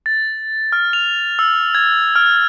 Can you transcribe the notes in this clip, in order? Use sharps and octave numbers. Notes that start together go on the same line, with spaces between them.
A6
F6
F7
E6
G#6
F6